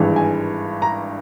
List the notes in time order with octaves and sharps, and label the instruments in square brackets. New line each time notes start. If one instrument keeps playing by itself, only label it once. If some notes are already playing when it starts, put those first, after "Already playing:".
Already playing: [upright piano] G#1 G2 E3 G#3
G#5
A#5